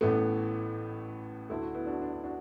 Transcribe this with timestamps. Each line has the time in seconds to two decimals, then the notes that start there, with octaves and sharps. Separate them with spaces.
0.01 A1 A2 E3 A3 B3
1.49 D2 D3 A3 E4
1.61 F#4
1.74 B3 E4
1.86 D4 F#4
2.02 D4
2.13 E4
2.24 D4 F#4